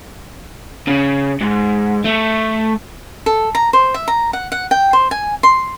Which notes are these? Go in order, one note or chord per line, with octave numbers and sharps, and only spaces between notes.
C#3
G#2
A3
A4
A#5
C5
E5
A#5
F#5
F#5
G5
C5
G#5
C6